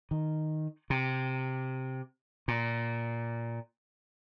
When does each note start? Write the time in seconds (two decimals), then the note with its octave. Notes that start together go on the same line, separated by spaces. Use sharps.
0.11 D#3
0.90 C3
2.48 A#2